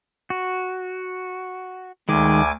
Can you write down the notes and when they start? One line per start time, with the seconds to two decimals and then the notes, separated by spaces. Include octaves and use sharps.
0.30 F#4
2.09 D2 D#3 G#3 G#5 D6